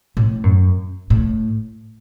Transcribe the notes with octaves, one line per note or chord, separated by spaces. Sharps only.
A2
F#2
A2